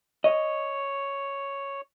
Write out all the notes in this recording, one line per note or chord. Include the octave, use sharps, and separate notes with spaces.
C#5 D#5